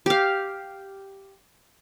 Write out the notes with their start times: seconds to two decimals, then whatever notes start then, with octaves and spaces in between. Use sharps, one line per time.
0.06 G4 F5